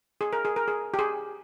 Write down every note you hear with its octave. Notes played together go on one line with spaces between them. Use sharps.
G#4
A#4
G#4
A#4
G#4
G4
G#4